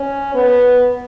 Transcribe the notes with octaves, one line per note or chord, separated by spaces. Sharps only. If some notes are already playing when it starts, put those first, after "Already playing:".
Already playing: C#4
B3